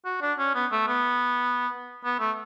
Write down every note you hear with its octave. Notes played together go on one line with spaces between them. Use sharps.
F#4
D4
C#4
B3
A3
B3
B3
A3